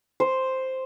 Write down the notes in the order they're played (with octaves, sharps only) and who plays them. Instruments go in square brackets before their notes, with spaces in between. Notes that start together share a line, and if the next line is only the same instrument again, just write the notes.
[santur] C5